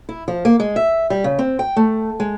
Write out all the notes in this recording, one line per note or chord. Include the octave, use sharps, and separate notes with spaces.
E4
F3
A#3
G#3
E5
G3
C#3
C4
G5
A3
G#3